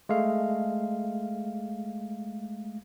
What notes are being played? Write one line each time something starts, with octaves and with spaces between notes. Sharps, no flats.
G#3 A3 F5